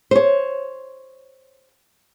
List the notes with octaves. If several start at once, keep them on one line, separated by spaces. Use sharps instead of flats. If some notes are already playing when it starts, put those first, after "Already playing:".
C5 C#5